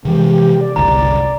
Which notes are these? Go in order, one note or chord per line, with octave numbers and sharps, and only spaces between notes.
C3 E3 G#3 G4
G4
D5
F#1 C2 D3 D5 A#5